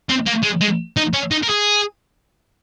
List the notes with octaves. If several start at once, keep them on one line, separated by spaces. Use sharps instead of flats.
C4
A#3
G#3
G#3
D#4
C#4
D#4
A#4
G#4